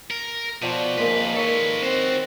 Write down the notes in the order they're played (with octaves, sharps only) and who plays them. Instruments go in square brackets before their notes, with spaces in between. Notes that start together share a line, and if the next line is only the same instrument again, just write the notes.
[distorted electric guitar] A#4
[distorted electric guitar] B2 [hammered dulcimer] F3 D5 G5
[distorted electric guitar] F2 B4 [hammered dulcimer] D#3 G#3 [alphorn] A#3
[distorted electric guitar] A4 B4 [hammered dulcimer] C#5
[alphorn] C4 [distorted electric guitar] F#4 C5